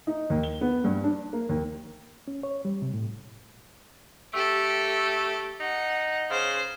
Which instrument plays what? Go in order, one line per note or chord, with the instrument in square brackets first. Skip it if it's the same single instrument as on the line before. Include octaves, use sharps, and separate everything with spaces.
[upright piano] D#4
D#2
G7
B3
G2
D4
A#3
D#2
[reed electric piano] C#4
C#5
G3
C3
A2
[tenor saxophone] A3 [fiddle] G4 A4
[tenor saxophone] D#4 [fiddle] F#5
[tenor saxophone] C#3 [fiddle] C5